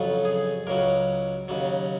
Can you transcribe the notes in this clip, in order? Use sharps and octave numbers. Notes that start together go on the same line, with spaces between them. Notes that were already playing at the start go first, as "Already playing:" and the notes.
Already playing: F2 C#3 F#3 F4
G#4
C#2 C#3 F#3 A#4
D#2 C#3 F#3